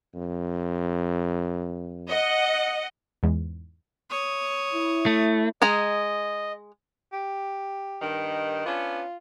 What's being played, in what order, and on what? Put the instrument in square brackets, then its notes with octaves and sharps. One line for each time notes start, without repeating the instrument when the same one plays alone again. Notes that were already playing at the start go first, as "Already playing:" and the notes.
[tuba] F2
[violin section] D#5 F#5
[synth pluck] E2 G#2
[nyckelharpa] C#5 D#6
[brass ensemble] E4
[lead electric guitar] A3
[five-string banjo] G#3 G#4 A#5 [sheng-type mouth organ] D#5
[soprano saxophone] G4
[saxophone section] G2 D#3
[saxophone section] B3 C#4 D4 [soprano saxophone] F4